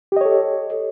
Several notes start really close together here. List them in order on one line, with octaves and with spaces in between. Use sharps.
G4 D#5 C#5 A4